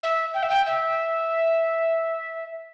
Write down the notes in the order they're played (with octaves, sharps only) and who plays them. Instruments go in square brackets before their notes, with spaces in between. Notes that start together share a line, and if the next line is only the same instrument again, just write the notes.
[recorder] E5
G5
E5
G5
E5